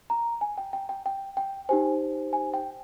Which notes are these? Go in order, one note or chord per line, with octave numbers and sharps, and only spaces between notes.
A#5
G#5
G5
G5
G5
G5
G5
D#4 G4 C5 G#5
G#5
G5